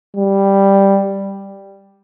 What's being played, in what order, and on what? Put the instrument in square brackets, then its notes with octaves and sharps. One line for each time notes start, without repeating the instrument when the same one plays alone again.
[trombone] G3